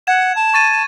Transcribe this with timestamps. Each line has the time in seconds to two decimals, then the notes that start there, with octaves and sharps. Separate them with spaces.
0.07 F#5 G#6 E7
0.35 A5
0.54 C#6 A6 D#7